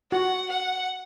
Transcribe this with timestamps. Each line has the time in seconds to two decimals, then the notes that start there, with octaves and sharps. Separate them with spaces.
0.12 F#4 F#5
0.50 F#5